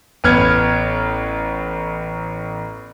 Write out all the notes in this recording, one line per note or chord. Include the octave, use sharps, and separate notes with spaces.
A1 B3 F6 G#6